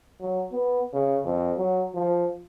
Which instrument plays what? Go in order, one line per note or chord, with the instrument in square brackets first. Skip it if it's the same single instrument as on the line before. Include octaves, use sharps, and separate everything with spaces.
[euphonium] F#3
B3
C#3
F2
F#3
F3